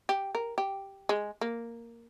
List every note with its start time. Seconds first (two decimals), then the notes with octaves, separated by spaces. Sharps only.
0.09 G4
0.35 A#4
0.58 G4
1.09 G#3
1.41 A#3